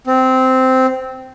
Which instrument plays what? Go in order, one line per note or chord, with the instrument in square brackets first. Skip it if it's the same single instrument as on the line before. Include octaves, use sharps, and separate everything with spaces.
[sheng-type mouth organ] C4